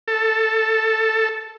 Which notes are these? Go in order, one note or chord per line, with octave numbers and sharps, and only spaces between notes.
A4